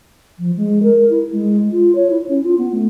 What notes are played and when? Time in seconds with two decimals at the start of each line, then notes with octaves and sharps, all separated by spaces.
0.39 F3
0.56 G#3
0.83 A#4
1.10 E4
1.32 G#3
1.71 F4
1.95 C#5
2.10 E4
2.29 C#4
2.44 F4
2.58 B3
2.72 A3